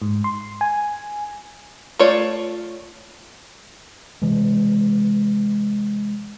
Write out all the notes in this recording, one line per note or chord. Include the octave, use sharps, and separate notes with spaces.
G#2
C6
G#5
A3 F4 C#5 D5
C3 E3 G#3